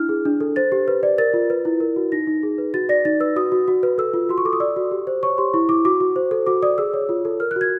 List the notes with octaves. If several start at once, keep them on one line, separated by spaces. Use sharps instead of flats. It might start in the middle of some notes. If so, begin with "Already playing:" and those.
Already playing: D4 E4 F6
G#4
D4
A4
C5 A6
G4
B4
D5
A#4 A6
F4
B4
E4
A#4
F#4
D#4 A#6
D#4
G#4
B4
F#4 A6
D5 A#6
D#4 A6
B4 E6
F#4 D#6
F#4
F#4
B4
A4 E6
F4
F#4 C6
C#6
A4 D6
D#6
D5 E6
F#4
G4
C5
C#5 C#6
G4 C6
E4 C#6
E4 D6
F#4 D6
F#4
C5
A4
F#4 D6
D5 D#6
G#4 E6
C#5
F4
A4
A#4 F6
F#6
F#4 G#6